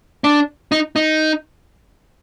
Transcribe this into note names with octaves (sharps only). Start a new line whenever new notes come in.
D4
D#4
D#4